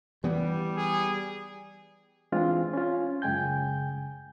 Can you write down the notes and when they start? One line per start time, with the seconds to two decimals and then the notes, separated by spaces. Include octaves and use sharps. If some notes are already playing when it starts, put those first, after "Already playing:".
0.24 E3 G3 B3
0.77 G#4
2.32 E3 G#3 C4 D4 F4
2.73 C#4 F4
3.22 F#2 C#3 G#3 G5 G#5 G6